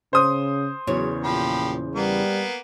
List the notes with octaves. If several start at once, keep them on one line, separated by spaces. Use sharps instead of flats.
C#3 C5 D#6
E2 C#3 F#3 C#5
A#2 F3 G4 B5
G3 A#3 B3